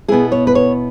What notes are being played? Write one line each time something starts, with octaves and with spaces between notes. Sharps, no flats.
B2 B3 E4 G#4
C#5
B4
C#5